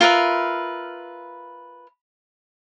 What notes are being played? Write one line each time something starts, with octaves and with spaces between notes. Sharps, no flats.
F4 A#4 B4 E5